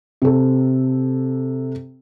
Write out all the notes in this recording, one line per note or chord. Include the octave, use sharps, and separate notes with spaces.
C3 A4